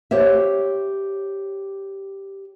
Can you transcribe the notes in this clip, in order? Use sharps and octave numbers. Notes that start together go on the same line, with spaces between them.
G4 C5 C#5 E5